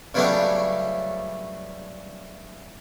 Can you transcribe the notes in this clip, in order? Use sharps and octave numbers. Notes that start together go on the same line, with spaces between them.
C#3 E3 F#3 G3 A3 D4